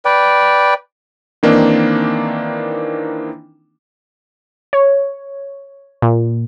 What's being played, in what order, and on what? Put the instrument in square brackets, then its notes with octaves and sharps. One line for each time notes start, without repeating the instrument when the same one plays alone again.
[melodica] B4 D5 G5
[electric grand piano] D#3 E3 A#3 C4 D4 D#4
[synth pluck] C#5
A#2